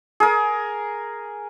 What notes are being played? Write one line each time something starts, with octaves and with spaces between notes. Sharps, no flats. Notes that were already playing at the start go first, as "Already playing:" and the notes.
G#4 A#4